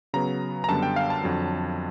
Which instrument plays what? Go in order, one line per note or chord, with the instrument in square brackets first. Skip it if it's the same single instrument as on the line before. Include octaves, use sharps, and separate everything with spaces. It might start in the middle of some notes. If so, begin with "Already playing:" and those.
[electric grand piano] C#3 F#3 B3 A#5
A#5
F#2 D3 G3 B3 A5
G5
F5
A5
F2 D3 F#3